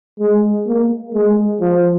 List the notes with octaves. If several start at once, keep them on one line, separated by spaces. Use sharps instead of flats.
G#3
A#3
G#3
F3